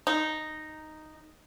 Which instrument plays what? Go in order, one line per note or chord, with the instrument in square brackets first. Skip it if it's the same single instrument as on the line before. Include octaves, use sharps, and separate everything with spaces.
[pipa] D#4